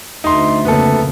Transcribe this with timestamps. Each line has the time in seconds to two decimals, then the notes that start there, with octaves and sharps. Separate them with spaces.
0.24 D2 A3 D#4 C6
0.65 F2 C#3 A#3 B3 A4